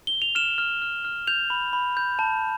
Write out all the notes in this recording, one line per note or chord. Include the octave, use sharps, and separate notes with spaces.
G7
F7
F6 E7
F6
F6
F6
G6 F7
B5
B5
G6
A5